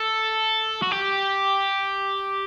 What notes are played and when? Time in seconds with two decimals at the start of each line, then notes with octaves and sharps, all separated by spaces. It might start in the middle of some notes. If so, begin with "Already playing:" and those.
Already playing: A4
0.83 F#4
0.92 G4